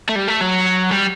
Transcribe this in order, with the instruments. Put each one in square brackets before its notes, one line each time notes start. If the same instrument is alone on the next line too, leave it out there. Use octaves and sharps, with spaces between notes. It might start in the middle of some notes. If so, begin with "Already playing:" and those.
[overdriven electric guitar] A3
G3
A3
F#3
G3